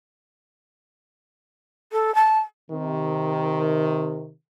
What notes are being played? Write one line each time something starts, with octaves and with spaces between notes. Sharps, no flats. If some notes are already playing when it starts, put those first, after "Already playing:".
A4
A5
C3 D#3